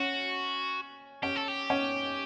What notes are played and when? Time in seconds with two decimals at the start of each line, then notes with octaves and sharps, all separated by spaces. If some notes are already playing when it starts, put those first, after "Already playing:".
Already playing: C#4 F#4
1.23 C#4 G4
1.36 A4
1.48 G4
1.70 C#4